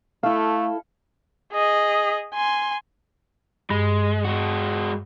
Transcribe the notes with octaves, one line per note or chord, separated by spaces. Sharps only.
A3 E4 A4 F5
G#4 D#5
G#5 C6
G2 G#3
G#3 F#4